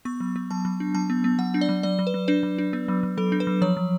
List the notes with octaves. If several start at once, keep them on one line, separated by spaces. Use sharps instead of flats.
B3 C#6
F#3
B3
F#3 A5
F#3
D4
F#3 A5
B3
B3
F#3 F#5
D4
D5
F#3
F#3 D5
F#3
B4
F#3
D4 B4
F#3
D4
B3
F#3
F#3
F#3 A4
D4
B4
F#3
F3 C#5
F3